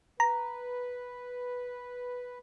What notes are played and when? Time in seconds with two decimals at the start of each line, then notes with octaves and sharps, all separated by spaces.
0.20 B4 A#5